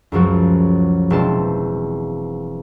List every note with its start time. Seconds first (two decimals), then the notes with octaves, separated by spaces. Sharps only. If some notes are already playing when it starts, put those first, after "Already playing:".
0.12 C#2 F#2 F3 F#3
1.10 E1 C4 A5 C6